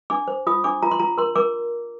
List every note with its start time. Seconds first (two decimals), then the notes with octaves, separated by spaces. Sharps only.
0.10 D4 D6
0.28 C5
0.47 F4 D#6
0.64 D4 D6
0.83 F4 A#5
0.91 C6
1.00 F4 A#5
1.18 A#4 C6
1.36 A#4 D6